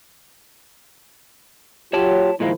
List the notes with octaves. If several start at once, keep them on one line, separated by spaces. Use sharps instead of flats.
F#3 F4 G4 C#5 A5
A#2 D#3 F3 G#3 A#3 E4